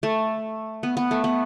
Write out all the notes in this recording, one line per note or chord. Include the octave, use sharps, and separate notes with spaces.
A3
B3
B3
A3
B3